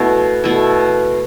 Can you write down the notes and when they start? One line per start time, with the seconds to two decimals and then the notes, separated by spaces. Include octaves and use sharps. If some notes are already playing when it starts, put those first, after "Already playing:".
Already playing: B2 A3 E4
0.44 B2 A3 E4